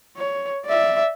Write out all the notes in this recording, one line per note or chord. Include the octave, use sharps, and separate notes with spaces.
C#5
D5 E5